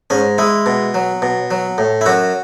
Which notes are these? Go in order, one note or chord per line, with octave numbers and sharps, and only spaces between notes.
G#2 C#4
G#3 E4
B2
F#3
B2
F#3
A2
E4
F#2 F#4